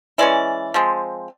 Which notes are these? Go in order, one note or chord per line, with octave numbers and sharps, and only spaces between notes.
E3 G#3 C#4 D5
F3 G#3 C4